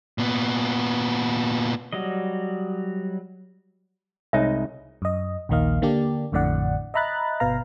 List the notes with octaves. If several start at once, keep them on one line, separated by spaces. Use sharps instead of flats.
A#2 B3
F#3 G3 D#5
C2 G#3 D#4 C#5 E5
F#2 D#5
A#1 D#2 D#3 A#3 D#5 F5
D3 A#3 D4 G4 D5
A1 F2 A2 D3 D5 F#5
D#5 E5 A#5 B5 F#6 A6
G1 B2 B4 F5 A#5